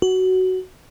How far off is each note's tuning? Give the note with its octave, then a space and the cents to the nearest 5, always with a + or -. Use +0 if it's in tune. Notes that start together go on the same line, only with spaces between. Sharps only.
F#4 +10